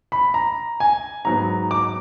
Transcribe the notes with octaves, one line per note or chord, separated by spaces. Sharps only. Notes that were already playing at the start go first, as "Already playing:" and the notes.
B5
A#5
G#5
G#2 F#3 B3 A#5
D6